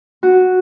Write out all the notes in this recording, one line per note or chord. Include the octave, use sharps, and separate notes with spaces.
F#4